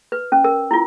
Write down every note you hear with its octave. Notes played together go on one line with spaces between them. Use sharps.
B4
C#4
A#4
E4 F4